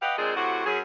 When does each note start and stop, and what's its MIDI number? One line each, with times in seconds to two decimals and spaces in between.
0.02 0.16 67
0.02 0.16 71
0.02 0.16 75
0.02 0.16 77
0.02 0.16 78
0.18 0.34 46
0.18 0.34 56
0.18 0.34 60
0.18 0.34 62
0.18 0.34 68
0.36 0.66 45
0.36 0.66 48
0.36 0.66 66
0.66 0.79 42
0.66 0.79 54
0.66 0.79 61
0.66 0.79 68